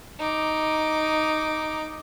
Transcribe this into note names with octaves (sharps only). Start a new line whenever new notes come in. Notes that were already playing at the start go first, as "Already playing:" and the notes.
D#4 D6